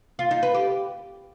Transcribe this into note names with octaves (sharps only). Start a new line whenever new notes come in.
F4
D#4
B4
G4